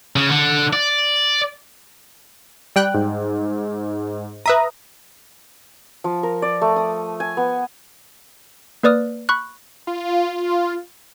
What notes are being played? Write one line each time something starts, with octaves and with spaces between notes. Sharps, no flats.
C#3
D3
D5
G3 G5 F#6
G#2
B4 E5 A#5 D#6
F3
A#4
D5
A3
D#6
G#5
B3
A#3 B4 D5 D#6 F6
B5 C#6 F#6
F4